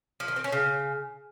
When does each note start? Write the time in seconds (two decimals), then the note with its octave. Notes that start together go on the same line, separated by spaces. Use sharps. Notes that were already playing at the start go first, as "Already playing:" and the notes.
0.20 F3
0.28 D#3
0.36 C4
0.44 C#4
0.52 C#3